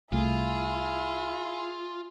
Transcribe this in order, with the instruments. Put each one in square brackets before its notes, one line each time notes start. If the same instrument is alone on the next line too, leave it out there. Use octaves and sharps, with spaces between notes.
[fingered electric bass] C2 A3 [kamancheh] E4 [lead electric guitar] F4 [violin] G#4